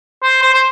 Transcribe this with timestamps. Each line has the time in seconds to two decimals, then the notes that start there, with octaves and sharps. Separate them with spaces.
0.23 C5
0.42 C5
0.54 C5